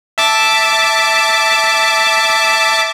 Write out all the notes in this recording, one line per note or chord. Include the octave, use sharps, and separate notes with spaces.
E5 A5 D6